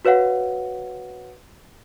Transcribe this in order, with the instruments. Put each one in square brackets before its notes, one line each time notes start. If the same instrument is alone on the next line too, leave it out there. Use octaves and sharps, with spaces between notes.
[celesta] F#4 B4 C#5 F5 F#5